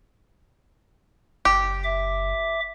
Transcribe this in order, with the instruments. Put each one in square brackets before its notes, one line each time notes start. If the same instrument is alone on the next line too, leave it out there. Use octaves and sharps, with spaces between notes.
[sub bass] F#1 [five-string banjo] G4
[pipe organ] E5 D6